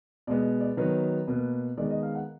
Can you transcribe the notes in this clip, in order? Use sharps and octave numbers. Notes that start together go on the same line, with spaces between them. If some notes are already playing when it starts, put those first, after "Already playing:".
B2 G#3 B3 D5
D5
D#3 F#3 B3 B4
B2 A#3 B4
D#3 G#3 B3 D5
D#5
F5
F#5